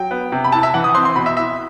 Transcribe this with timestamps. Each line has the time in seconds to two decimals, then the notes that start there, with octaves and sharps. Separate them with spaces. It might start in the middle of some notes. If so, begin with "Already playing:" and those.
Already playing: F#3 G5
0.11 B3
0.32 C3
0.44 B5
0.52 E4 A5
0.63 E5
0.74 E3 F#5
0.84 D#6
0.94 C4 C6
1.05 C6
1.16 B2 B5
1.26 E5
1.37 E4 E5